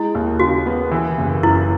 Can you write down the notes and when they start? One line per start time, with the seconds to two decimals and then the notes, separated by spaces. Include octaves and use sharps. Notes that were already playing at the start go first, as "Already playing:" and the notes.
Already playing: G#3 E4
0.15 D#2
0.39 C#3 F#4
0.66 B3
0.91 E3
1.18 F#1
1.43 F#2 E4